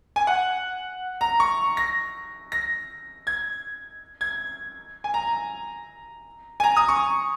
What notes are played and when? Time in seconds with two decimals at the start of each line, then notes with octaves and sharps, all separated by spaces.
0.16 G#5
0.27 F#5
1.21 A#5
1.40 C#6
1.77 A#6
2.52 A#6
3.27 G#6
4.21 G#6
5.04 G#5
5.14 A#5
6.60 G#5
6.64 A#5
6.77 D#6
6.88 C#6